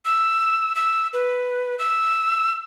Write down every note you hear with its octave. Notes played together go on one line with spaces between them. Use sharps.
E6
E6
B4
E6